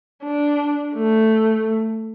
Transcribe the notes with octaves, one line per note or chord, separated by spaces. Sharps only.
D4
A3